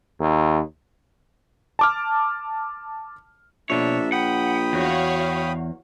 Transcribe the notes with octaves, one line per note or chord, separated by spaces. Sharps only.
D#2
A5 D6 F6
A#1 B2 D4 C#5 E5
F#5 G5 B5 D#6
E2 F#4 C#5 F5